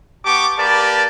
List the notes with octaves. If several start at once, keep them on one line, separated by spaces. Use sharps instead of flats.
B3 G4 A5 C#6 D6
A#3 G4 A#4 B4 D5 A5